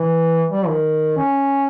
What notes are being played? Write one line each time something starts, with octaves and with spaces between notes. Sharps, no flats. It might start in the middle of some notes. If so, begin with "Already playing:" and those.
Already playing: E3
G3
D#3
C#4